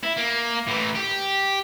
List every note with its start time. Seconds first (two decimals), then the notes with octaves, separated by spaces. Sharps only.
0.04 E4
0.17 A#3
0.67 A2 E3
0.95 G4